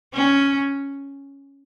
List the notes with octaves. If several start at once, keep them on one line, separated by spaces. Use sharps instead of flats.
C#4